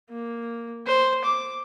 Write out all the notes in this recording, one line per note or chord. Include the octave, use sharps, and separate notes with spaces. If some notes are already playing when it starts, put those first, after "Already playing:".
A#3
C5
D6